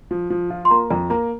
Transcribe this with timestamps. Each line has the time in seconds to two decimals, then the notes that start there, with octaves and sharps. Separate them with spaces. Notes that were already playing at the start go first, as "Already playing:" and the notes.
0.11 F3
0.30 F3
0.50 F4
0.65 C6
0.71 A#3 A#5
0.90 F2 A#5
1.10 A#3 A#5